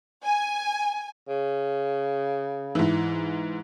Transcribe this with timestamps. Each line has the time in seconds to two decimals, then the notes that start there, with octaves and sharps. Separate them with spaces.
0.24 G#5
1.28 C#3
2.75 G#2 E3